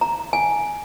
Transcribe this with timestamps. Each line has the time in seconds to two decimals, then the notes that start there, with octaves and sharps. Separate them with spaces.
0.01 A#5
0.33 G#5